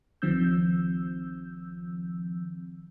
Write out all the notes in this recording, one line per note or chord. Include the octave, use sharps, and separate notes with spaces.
G1 D#3 F3 C4 E6 G6